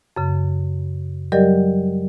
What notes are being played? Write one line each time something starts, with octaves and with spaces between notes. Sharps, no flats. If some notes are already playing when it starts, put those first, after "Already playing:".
F#2 C#3
F#3 G3 G4 A#4 D5 D#5